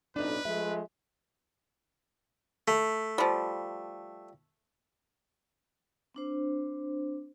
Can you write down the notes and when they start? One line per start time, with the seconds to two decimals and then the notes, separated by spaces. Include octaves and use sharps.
0.16 B1 F2 A2 D4 D#4 B4
0.45 F3 G#3 A3 E5
2.68 A3
3.18 F3 G3
6.15 C4 D4 C5